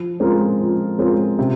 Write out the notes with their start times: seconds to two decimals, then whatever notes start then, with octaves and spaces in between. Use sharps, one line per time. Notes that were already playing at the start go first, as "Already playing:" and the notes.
Already playing: F3
0.20 G#3 C4 F4 A#4
0.59 F3
0.99 G#3 C4 F4 A#4
1.39 C3